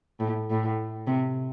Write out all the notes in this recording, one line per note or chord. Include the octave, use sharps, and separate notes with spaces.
A2
A2
C3